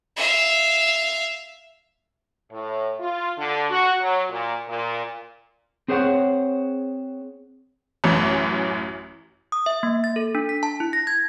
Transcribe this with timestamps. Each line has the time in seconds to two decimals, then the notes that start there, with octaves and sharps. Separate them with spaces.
0.16 E5 F5
2.50 A2
2.99 F4
3.36 D3
3.70 F#4
4.00 F#3
4.29 A#2
4.68 A#2
5.88 C4 G#4 C5 C#5 F#5
8.04 A1 F#2 E3
9.52 D#6
9.66 E5
9.83 A#3
10.04 A6
10.16 A4
10.35 D4
10.49 B6
10.63 A5
10.80 E4
10.93 A#6
11.07 G#6